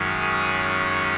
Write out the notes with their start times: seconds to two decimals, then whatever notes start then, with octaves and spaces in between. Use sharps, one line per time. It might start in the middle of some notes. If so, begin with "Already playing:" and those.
Already playing: F#2 D#3 G#3 C#4
0.21 G#4